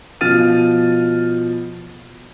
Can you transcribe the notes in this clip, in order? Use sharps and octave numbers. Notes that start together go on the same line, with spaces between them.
B2 F3 F6 A6 D#7